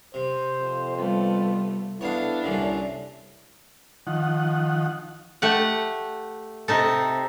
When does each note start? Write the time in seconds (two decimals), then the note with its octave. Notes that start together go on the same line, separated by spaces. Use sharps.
0.14 C3 C5
0.61 F2
0.97 G3 A3 B3 F4
2.01 B3 D4 E4 A4 C#5 F5
2.43 C2 A#2 D3 C#4
4.07 D#3 F3 F#5
5.42 A3 G4 F#5
6.68 C3 D#4 A4